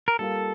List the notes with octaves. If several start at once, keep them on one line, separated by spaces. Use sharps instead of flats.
A#4
G3 A#3 F4 A4 A#4 F5